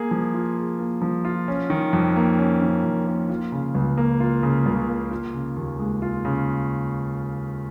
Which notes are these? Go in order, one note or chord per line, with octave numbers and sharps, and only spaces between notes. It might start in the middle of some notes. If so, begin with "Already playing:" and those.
Already playing: A#3 G#4
F3
F4
G#4
A#3
F3
F4
C#4
D#3
F2
A#3
C#4
D#3
F2
A#3
F4
C#3
C#2
A#3
F4
C#3
C#2
A#3
F4
C#3
D#2
G#3
F4
C#3